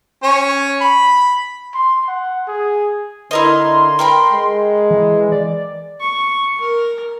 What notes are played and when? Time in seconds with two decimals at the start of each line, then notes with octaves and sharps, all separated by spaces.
0.23 C#4 C#5
0.81 B5
1.75 C6
2.08 F#5
2.48 G#4
3.31 D3 E4 A#4 D#5 C6
3.99 A#4 G5 B5
4.32 G#3
4.91 E3
5.32 D5
6.00 C#6
6.60 A#4